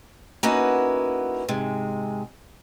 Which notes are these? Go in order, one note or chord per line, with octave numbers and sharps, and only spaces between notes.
A#3 B3 C#4 D#4 E4 F#4
G#2 C3 G#3